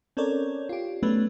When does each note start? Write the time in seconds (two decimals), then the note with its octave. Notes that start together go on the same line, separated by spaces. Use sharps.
0.17 C4 C#4 A4 A#4 C#5 D5
0.69 F4 G4
1.03 F#3 A3 B3 C#4 D4 B4